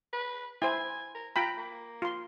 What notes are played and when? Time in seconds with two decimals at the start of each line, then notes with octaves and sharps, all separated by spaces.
0.13 B4
0.62 E4 C5 G#5
1.15 A#4
1.36 F4 G5 A#5 B5
1.57 A#3
2.02 F4 C6